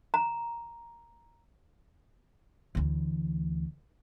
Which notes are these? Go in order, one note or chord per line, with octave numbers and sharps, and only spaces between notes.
A#5
D2 E3